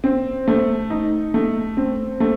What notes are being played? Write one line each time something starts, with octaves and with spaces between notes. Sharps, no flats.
C4
A3
D#4
A3
C4
A3